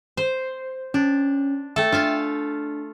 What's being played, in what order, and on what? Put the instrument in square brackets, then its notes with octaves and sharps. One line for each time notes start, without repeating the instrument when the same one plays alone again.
[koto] C5
[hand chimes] C#4 [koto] D4
[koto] A3 A4 [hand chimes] E5 G5
[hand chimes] D4 [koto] F4 E5 F5